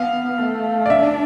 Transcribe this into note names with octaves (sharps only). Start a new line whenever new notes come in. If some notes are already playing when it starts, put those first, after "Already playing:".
Already playing: B3 F5
A3
D5
D4 E5